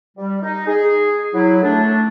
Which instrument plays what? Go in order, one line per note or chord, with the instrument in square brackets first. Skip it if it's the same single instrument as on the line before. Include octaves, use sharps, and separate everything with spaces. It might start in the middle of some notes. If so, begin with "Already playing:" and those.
[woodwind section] G3
D#4
G#4
F#3 E4
A3 D4